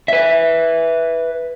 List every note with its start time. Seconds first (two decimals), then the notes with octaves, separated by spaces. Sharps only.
0.08 B4 E5